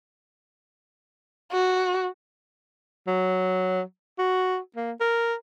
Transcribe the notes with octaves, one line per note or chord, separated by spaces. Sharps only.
F#4
F#3
F#4
A#3
A#4